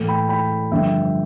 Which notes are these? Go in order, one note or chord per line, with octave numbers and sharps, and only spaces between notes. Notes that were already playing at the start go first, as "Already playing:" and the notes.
Already playing: A2 E3 A3
G5 B5
G5 B5
G2 D3 F3 A3 E5 G5